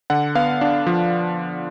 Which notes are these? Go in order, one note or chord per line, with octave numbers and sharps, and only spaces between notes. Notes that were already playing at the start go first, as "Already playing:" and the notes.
D3 F#5
B3 F5
D4
F3